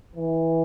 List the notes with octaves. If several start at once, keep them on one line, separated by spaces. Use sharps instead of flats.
E3